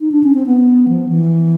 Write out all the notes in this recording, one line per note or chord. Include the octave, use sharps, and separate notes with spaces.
D#4
D4
C#4
C4
B3
F3
E3